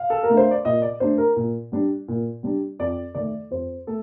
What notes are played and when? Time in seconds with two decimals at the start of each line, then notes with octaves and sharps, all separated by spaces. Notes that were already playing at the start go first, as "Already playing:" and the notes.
Already playing: F5
0.10 A4
0.23 A#4
0.29 A3 D4
0.37 C5
0.51 D5
0.65 A#2 D#5
0.82 D5
1.00 A3 D4 C5
1.18 A#4
1.36 A#2
1.72 G3 D4
2.08 A#2
2.43 G3 D4
2.79 F2 D5
3.15 D#3 A3 D5
3.51 F2 C5
3.87 A3 A4